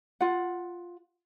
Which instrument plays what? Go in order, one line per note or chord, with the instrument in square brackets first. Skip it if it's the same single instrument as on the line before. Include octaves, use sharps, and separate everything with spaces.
[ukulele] F4 F#5